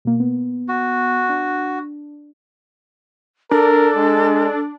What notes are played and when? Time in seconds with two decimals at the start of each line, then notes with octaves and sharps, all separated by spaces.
0.05 B2 A#3
0.20 B3
0.68 F#4
1.29 D4
3.51 D4 A4 A#4
3.96 G#3